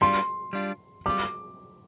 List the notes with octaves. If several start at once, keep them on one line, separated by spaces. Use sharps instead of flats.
G3 D4 F4 C6
G3 D4 F4
G3 F4 D6